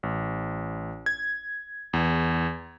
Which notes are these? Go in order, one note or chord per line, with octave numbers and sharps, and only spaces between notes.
A1
G#6
E2